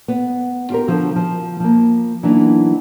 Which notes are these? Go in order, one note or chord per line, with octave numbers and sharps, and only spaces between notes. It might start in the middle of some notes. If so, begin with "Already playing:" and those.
B3
F4 G4 A#4
D3 F3 F#4
F3
F3 A#3
E3 F#3 A#3 B3 D4 D#4